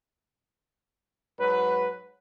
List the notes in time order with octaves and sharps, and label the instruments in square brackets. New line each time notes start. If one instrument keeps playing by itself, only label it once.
[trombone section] G#2 F#3 B4